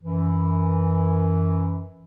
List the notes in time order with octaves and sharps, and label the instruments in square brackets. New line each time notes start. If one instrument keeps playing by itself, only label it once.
[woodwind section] F#2 E3